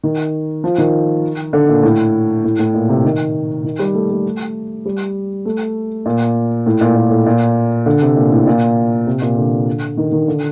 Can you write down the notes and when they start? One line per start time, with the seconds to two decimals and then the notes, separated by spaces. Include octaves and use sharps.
0.03 D#3
0.64 F3
0.78 D#3
1.53 D3
1.69 A#2
1.83 A2
2.44 A2
2.59 A2
2.74 A#2
2.89 C3
3.05 D#3
3.64 D#3
3.79 G3
3.94 A3
4.10 A3
4.85 G3
5.45 A3
6.06 A#2
6.66 A2
6.81 A#2
6.96 A#2
7.11 A2
7.26 A#2
7.86 D3
8.02 C3
8.16 A#2
8.32 A2
8.47 A#2
9.07 C3
9.22 A#2
9.37 D3
9.97 D#3
10.12 D#3
10.28 D3